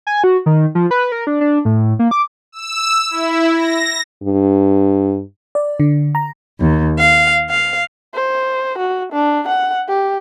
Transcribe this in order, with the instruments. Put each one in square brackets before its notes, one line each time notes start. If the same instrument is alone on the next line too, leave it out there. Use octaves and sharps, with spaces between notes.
[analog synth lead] G#5
F#4
D#3
F3
B4
A#4
D4
D4
A2
A#3
D6
[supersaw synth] E6
E4
A#6
[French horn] G2
[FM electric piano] D5
D3
A#5
[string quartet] D#2
F5
F5
[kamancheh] C5
F#4
D4
F#5
G4